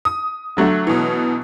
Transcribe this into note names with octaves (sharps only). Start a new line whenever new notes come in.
D#6
D3 F#3 A3
B2 E3